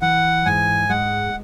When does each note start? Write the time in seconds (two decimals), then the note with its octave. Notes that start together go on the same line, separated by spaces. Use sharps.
0.02 E3 F#5
0.46 G#2 G#5
0.89 G#3 F#5